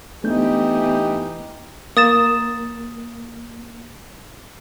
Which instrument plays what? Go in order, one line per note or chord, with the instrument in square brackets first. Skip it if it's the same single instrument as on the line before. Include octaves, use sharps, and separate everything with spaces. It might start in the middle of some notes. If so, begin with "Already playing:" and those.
[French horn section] E3 G4 [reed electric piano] A3 D4 G6 [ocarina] B3 [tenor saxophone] D#4
[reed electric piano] A#3 [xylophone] D#6 A6 E7